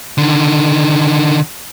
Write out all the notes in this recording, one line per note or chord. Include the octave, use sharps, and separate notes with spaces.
D3 D#3